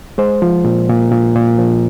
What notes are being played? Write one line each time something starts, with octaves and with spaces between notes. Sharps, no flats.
G#3 C5
F3
A#2
A#2
A#2
A#2
F3